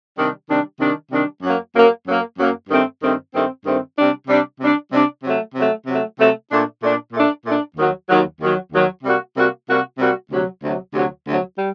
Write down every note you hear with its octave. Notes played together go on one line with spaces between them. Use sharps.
C3 D#3 G3 D4
C3 D#3 G3 D4
C3 D#3 G3 D4
C3 D#3 G3 D4
F#2 F#3 A#3
F#2 F#3 A#3
F#2 F#3 A#3
F#2 F#3 A#3
G2 D#3 A3 C4
G2 D#3 A3 C4
G2 D#3 A3 C4
G2 D#3 A3 C4
C3 G3 D4
C3 G3 D4
C3 G3 D4
C3 G3 D4
C3 F#3 A3
C3 F#3 A3
C3 F#3 A3
C3 F#3 A3
A#2 A3 D4
A#2 A3 D4
A#2 A3 D4
A#2 A3 D4
D#2 D#3 F#3
D#2 D#3 F#3
D#2 D#3 F#3
D#2 D#3 F#3
C3 G3 A#3 F#4
C3 G3 A#3 F#4
C3 G3 A#3 F#4
C3 G3 A#3 F#4
D2 C3 F#3
D2 C3 F#3
D2 C3 F#3
D2 C3 F#3
G3